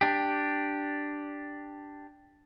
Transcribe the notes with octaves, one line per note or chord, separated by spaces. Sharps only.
D4 G4